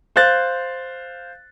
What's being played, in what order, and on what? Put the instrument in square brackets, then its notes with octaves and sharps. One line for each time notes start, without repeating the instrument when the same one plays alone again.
[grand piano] C5 F5 F#6 A6